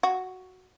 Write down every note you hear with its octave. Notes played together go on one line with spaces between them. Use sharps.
F#4